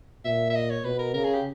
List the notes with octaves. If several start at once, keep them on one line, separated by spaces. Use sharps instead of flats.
A#2 E5
E5
D#5
C#5
B2 B4
A#4
C#3 A#4
G#4
G4